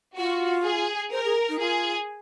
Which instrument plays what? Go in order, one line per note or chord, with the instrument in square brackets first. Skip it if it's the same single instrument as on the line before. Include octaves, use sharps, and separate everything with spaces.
[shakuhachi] F4 [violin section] F#4
[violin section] G#4
[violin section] A#4 [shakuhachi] C5
[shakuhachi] G#4
D#4
[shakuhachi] F4 [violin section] G#4